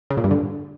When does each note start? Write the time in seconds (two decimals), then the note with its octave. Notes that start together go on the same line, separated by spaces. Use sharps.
0.10 C#3
0.17 A#2
0.24 G2
0.31 D3